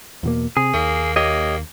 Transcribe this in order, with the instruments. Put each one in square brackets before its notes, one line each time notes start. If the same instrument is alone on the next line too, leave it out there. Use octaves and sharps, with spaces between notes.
[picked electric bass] E2 B2 A#3
[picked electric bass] C3 [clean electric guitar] G#4
[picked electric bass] D#2 [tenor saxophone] A#3
[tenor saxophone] A#3 [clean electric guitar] G4 C#5 D#5